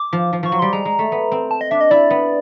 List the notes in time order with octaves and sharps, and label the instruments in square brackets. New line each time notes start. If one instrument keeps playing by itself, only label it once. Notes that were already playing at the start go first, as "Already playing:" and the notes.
Already playing: [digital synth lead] D6
[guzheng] F3
F3
[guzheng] F3 [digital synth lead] C#6
[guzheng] F#3
[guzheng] G3 [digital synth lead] C6
[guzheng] G#3 [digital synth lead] A#5
[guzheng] G#3
A3
B3
C4
[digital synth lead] A5
D#5
[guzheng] D4 [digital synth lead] E5
[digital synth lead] D#5
[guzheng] E4 [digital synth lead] D5
[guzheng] B3